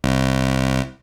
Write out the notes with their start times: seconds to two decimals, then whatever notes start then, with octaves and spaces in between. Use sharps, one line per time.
0.04 C2